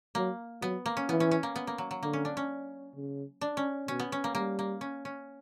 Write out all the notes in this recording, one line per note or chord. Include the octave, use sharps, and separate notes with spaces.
F#3 A#3
F#3 B3
A#3
C#4
E3 B3
C#4
C#4
A#3
B3
A#3
F#3
F#3
D3 A#3
C#4
D4
C#4
C#3
D4
C#4
B2 C#4
B3
C#4
A#3
G3 A#3
A#3
C#4
C#4